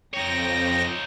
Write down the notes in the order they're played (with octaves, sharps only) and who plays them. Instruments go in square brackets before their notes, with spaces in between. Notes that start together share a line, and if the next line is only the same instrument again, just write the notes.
[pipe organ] F2 G5 A#6 [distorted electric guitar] D#4 C#5